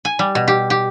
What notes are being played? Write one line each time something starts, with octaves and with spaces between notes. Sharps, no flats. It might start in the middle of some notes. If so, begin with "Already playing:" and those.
G#5
G3
B2
G4
G4